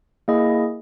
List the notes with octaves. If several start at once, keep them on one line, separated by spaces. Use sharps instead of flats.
A#3 E4 G#4 D#5